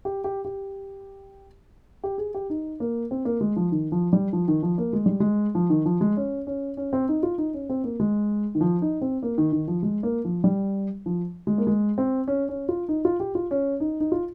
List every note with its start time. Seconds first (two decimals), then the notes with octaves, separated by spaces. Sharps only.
0.05 G4
0.24 G4
0.45 G4
2.04 G4
2.18 G#4
2.34 G4
2.50 D#4
2.80 A#3
3.11 C4
3.25 A#3
3.41 G#3
3.56 F3
3.72 D#3
3.92 F3
4.13 G3
4.33 F3
4.48 D#3
4.63 F3
4.78 A#3
4.93 G#3
5.06 G3
5.20 G#3
5.55 F3
5.70 D#3
5.86 F3
6.01 G#3
6.17 C#4
6.47 C#4
6.77 C#4
6.93 C4
7.08 D#4
7.23 F4
7.38 D#4
7.54 C#4
7.69 C4
7.84 A#3
8.00 G#3
8.55 D#3
8.61 F3
8.82 D#4
9.02 C4
9.23 A#3
9.38 D#3
9.52 D#3
9.68 F3
9.83 G#3
10.03 A#3
10.25 F3
10.44 G3
11.06 F3
11.47 G#3
11.58 A#3
11.67 G#3
11.98 C4
12.28 C#4
12.49 C#4
12.69 F4
12.89 D#4
13.05 F4
13.20 G4
13.35 F4
13.51 C#4
13.80 D#4
14.00 D#4
14.12 F4